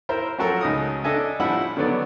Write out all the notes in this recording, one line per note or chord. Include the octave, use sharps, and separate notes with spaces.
E4 A#4 C5 E5
F3 F#3 A3 F#4 A4 A#4
C#2 D#4 D#6
D4 A4 D#5 E5 G#5
A2 F3 G3 E4 F#5 B5
D3 D#3 F#3 B3 D5